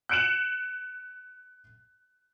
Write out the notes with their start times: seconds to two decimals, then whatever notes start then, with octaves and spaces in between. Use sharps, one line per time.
0.09 F#6 G6 C#7 D7 E7 F#7